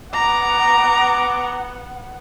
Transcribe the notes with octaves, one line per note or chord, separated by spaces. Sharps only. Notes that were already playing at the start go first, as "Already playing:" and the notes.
B3 F#5 A#5 D6